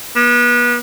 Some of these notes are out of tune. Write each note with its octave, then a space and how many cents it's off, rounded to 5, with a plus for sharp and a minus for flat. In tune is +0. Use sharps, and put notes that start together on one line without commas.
B3 -30